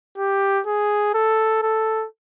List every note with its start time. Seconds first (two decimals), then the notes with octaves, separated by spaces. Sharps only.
0.18 G4
0.67 G#4
1.15 A4
1.63 A4